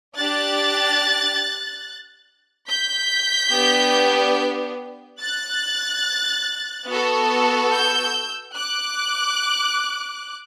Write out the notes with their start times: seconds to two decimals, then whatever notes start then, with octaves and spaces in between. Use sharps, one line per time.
0.17 D4 G4 F#6 A6
2.69 G6 B6
3.53 B3 D4 G4
5.20 F#6 A6
6.88 B3 F#4 A4
7.72 E6 G6
8.56 D6 F#6